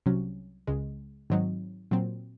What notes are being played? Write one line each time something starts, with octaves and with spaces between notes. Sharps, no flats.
C2 C3 F#3 C#4 F#4
C#2 C#3 G#3
G#2 D#3 F#3 C4 D#4
A#2 F#3 C4